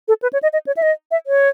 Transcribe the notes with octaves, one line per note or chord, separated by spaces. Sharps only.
A4
B4
C#5
D#5
D#5
C#5
E5
D#5
E5
C#5